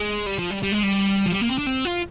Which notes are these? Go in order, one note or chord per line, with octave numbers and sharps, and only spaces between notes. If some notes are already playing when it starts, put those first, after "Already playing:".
Already playing: G#3
G3
F3
G3
G3
G#3
G3
F3
G3
A#3
C4
D4
C4
F4